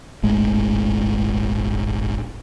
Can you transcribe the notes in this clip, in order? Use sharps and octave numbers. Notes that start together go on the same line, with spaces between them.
D#1 G#1 A2 G#3